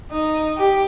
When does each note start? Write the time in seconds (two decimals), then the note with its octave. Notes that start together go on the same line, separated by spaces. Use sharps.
0.11 D#4
0.58 G4